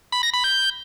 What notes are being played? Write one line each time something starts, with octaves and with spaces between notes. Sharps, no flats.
B5
A#6
B5
G6